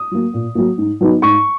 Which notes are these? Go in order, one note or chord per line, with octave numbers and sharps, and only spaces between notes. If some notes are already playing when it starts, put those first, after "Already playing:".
Already playing: D#6
F#3 A#3
A#2
F#3 A#3
G#2
F#3 B3 D#4
G#2 C#6